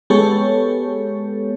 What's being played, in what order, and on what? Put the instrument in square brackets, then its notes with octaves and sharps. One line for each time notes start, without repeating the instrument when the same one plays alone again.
[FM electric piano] G#3 B3 G4 A4 C#5